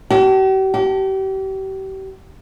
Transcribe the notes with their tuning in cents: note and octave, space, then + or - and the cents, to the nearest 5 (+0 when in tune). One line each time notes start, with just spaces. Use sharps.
G4 -45
G4 -35